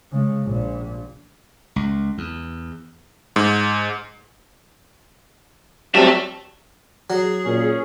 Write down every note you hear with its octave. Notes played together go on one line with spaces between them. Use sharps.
C#3 G#3
A#1 A#2
C#2
E2
G#2
F#3 G3 C4 E5 A5
F#3 G#4
A#2 C#4